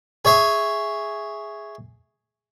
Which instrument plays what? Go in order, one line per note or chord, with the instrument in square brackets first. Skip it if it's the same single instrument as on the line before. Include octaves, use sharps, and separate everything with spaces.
[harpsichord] G#4 C#5 E5